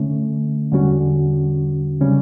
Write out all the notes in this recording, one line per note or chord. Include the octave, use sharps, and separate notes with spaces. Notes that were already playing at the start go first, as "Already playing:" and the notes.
Already playing: D3 A3 C#4
E2 D3 G3 C#4 F#4
C#3 G3 C#4